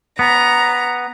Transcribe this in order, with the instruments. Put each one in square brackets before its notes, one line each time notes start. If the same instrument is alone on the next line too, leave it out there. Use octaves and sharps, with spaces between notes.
[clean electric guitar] B3 [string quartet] A#5